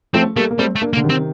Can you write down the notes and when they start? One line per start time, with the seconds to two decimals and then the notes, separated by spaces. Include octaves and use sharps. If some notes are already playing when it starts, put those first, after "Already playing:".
0.14 F3 A3 C4
0.36 G3 A3 A#3
0.51 A#3
0.59 G3 A3 C4
0.76 A3
0.82 A#3 D4
0.93 A#3
0.97 D3
1.04 C3 D#3
1.09 C4